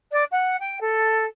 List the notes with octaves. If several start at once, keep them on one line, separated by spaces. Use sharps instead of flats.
D5
F#5
G5
A4